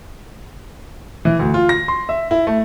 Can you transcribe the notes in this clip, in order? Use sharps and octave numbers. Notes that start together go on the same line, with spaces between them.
E3
D2
F4
A#6
C6
E5
E4
A3